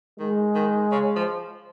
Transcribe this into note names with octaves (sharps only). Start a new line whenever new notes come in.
D#3 G#3
D#3
C#3
F3